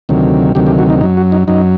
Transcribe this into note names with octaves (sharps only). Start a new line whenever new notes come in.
D2 C3 D#3 F#3
D2 C3 D#3 F#3 G4
G4
F#4
D#4
F#2 F#3 D#4
F#4
D#4
F#2 F#3 D#4